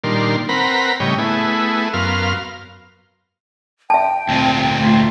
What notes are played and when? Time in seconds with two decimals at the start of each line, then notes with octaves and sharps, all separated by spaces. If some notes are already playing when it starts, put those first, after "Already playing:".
0.04 A#2 D#3 G3 D4 A#4 C6
0.49 C4 A#4 B4 F#5 A#5 B5
1.00 A2 C#3 G3 C#5 D#5 G5
1.18 A3 B3 E4 G#4
1.93 F#2 B3 A#4 F5 C6 F6
3.90 E5 G5 A5
4.29 D2 A#2 C4
4.78 A3 F4